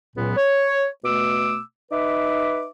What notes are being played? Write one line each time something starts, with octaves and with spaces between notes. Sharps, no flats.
C#2 A#2 F#3 B3
C#5
B2 A3 D6 E6
D#4 B4 E5 D6